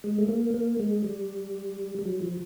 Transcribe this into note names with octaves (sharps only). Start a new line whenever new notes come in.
G#3
A3
A#3
A#3
G#3
G3
G3
F#3
F3